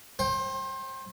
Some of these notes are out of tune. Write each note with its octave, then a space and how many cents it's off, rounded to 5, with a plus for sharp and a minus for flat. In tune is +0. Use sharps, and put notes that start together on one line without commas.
C5 +30 G5 +0